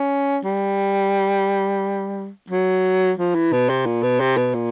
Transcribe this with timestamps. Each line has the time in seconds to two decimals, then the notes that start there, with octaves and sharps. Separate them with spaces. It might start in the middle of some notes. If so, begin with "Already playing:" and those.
Already playing: C#4
0.45 G3
2.50 F#3
3.18 F3
3.35 E3
3.52 B2
3.69 C3
3.86 A#2
4.03 B2
4.20 C3
4.37 B2
4.54 A#2